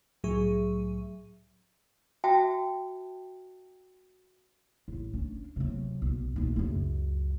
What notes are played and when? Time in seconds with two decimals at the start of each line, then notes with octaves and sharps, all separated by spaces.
0.24 C2 A2 F#3 G#4 E5 C#6
2.24 F#4 E5 G5 A5
4.88 A1
5.13 C#4 D4
5.56 C3 F#3
6.02 B1
6.36 B1 F#2
6.56 C#2 F#2